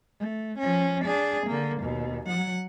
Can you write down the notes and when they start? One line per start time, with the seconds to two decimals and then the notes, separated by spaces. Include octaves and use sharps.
0.19 A3
0.59 F3 C#4
1.04 D4 G#4
1.46 D3 A#3
1.81 D#2 B2
2.26 F#3 F#5